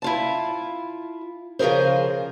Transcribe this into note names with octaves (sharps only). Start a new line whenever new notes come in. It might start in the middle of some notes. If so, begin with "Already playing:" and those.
E4 F4 A5
C#3 F3 G#4 A#4 C5